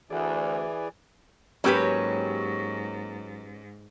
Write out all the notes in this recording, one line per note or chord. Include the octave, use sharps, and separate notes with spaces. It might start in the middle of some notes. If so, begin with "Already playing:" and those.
D2 E3 G#4 D5
G#2 F#3 A#3 C#4 G4 B4 C#5